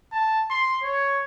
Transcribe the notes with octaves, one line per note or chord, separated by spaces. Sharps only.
A5
C6
C#5